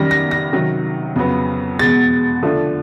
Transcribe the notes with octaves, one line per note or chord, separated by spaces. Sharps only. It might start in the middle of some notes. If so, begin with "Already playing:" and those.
Already playing: F#2 D#3 G3 A#6
A#6
A#6
C3 D#3 F#3
F2 C#3 F#3 B3
E2 B2 G#3 A6
D3 F3 A3 D4